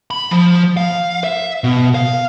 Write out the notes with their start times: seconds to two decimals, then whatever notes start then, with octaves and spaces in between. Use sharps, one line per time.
0.11 B5
0.31 F3
0.77 F5
1.24 E5
1.64 B2
1.95 F5